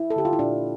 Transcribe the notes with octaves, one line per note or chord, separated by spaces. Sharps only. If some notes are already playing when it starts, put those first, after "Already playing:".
Already playing: E4
A4
D3 G4
F4
E4
A#2 D4